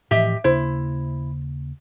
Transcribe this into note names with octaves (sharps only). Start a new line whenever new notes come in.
A2 E3 F3 G4 D#5 E5
D#2 C#3 A#3 E4 C5